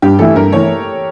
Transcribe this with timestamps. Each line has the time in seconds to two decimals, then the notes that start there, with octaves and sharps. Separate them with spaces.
0.02 G2 G4
0.19 E3 A3 E4 A4
0.36 G2 A#4
0.52 E3 A3 E4 C#5